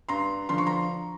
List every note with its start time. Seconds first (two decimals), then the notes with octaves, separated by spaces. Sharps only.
0.09 G2 A#5 C6
0.49 D3 F3 C6
0.58 C#6
0.66 A#5 C6